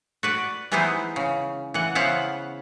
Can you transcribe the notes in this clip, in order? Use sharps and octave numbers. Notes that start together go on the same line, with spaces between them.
F#4 B4 D5
E3 G#3 B3 D#4 E4 C5
C#3
E3 F#5
C#3 B3 E4 C5 F5 F#5